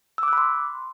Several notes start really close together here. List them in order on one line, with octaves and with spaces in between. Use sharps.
E6 D6 F#6 B5 C6